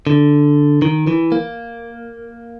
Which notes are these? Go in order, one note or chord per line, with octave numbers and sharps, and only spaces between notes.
D3
D#3
E3
A#3